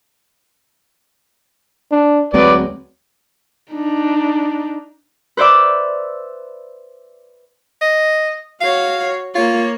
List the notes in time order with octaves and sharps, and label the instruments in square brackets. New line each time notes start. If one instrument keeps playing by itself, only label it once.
[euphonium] D4
[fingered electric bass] D2 G#3 C4 [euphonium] F#3 [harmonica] B4 D5
[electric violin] D4 D#4
[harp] B4 C5 D5 E5 D6
[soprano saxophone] D#5
[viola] F#4 C#5 [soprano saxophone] F5
[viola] A#3 C#5 [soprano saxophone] F4